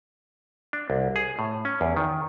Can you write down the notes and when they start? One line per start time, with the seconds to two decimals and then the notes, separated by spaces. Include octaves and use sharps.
0.73 D4
0.90 C2
1.16 G#4
1.39 A2
1.65 C#4
1.81 E2
1.97 D#3